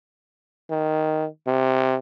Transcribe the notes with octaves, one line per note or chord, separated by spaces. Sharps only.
D#3
C3